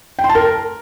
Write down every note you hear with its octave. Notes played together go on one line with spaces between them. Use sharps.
G5
C6
A5
A#4